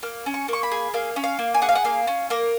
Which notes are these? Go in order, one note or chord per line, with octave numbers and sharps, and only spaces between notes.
A#3 F6
C#4
C#6
A#3 C#6
B5
G#4
A#3 F5
C#4
F5
A#3
G#5
G#4 F#5
F5
F#5
A#3 F5
C#4
A#3 A#4